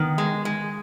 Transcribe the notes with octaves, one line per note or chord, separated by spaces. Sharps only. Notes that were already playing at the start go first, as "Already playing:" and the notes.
Already playing: D#3 B3
G#3
G#3